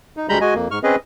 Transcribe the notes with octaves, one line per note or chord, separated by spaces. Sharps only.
D#4
D2 G3 G#3 A#5 B5 G6
G#3 F#4 D#5 G#5
F2 A#3
G#2 C#6 F6
C4 C#4 G#4 B4 D#5